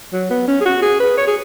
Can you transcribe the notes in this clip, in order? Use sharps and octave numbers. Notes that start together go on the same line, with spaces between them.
F#3
B3
C#4
G#4
F#4
G#4
B4
C#5
G#4